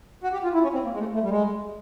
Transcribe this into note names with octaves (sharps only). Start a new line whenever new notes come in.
F#4
G4
F4
E4
C#4
C4
A#3
G#3
A3
A3
G3
G#3